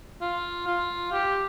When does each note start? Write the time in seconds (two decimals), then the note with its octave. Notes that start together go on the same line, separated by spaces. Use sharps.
0.21 F4
0.67 F4
1.12 G4